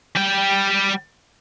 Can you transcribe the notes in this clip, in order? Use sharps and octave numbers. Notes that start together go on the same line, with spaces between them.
G3 G5